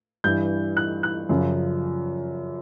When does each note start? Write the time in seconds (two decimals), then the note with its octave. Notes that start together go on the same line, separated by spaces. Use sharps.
0.24 G2 E3 G6
0.77 F#6
1.03 F#6
1.29 F#2 C#3 F3